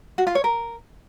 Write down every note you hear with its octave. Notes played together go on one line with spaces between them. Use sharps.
F#4
F4
C#5
A#4